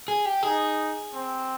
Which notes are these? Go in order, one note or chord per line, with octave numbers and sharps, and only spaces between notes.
G#4
G4
D#4 G#4
C4